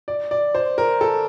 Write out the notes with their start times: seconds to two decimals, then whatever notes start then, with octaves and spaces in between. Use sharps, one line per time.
0.08 D5
0.31 D5
0.55 C5
0.78 A#4
1.01 A4